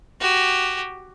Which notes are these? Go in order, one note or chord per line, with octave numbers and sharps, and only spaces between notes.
F#4 G4